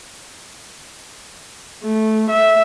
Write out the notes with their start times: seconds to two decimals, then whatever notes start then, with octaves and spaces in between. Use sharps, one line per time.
1.83 A3
2.30 E5